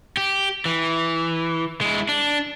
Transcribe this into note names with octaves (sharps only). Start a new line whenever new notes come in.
G4
E3
G#3 E4
D4